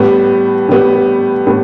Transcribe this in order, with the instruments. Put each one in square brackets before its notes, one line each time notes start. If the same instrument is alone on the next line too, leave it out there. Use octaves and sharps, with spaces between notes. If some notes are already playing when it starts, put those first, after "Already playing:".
Already playing: [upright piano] A2 G3 B3
A2 G3 B3
A2 G3 B3